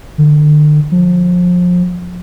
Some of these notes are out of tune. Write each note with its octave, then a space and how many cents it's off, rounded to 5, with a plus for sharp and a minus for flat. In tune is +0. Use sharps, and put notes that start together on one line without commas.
D3 +35
F3 +30